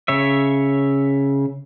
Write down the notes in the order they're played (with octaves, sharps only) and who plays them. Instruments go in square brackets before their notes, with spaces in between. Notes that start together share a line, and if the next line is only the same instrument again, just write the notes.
[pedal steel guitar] C#3 C#5 E5